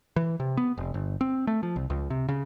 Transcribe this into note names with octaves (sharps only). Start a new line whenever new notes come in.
E3
C3
B3
F1
G1
C4
A3
F3
C2
C#2
C3
C#3